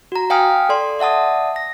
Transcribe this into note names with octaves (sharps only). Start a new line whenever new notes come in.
F#4 A#5
F5 G5 G#5 D#6 F6
A4 D5 C6
D5 E5 F#5 A5 D#6
A#6